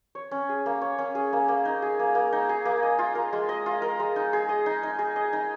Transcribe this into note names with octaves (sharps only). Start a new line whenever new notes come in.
C#5
C#4
G#4
A#3
C#5
C#4
G#4
A#3
A#3
D#4
G#4
A#3
A#3
D#4
G#4
A#3
D#5
F4
A#4
G#3
D#5
F4
A#4
G#3
D#4
G#4
D#5
D#4
D#4
G#4
D#5
D#4